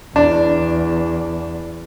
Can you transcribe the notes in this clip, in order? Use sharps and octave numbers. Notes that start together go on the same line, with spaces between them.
E2 D4